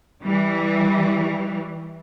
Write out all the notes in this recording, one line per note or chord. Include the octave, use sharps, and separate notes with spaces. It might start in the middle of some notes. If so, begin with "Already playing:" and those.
E3 G3